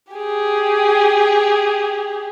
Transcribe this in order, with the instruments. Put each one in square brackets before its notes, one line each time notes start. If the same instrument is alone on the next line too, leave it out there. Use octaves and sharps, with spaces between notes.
[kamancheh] G4 G#4